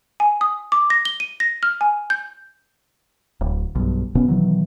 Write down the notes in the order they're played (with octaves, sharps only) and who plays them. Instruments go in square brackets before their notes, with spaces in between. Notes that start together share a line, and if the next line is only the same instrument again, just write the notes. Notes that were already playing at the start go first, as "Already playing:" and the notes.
[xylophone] G#5
D#6
D6
A#6
G7
D#7
A#6
F6
G#5
G6
[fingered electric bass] D1
B1 G2
E1 B2 B3 C#4
B2 D#3 E3 F#3